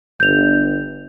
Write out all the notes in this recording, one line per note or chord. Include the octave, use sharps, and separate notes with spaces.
G1 G6 F7